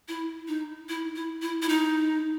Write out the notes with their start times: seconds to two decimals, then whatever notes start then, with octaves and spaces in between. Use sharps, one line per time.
0.08 E4
0.48 D#4
0.89 E4
1.16 E4
1.42 E4
1.62 E4
1.69 D#4